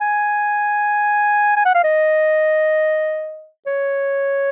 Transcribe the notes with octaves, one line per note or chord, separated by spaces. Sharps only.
G#5
G#5
F#5
F5
D#5
C#5